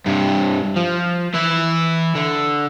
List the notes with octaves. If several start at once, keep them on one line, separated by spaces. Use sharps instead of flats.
G2 C3
F3
E3 E4
D3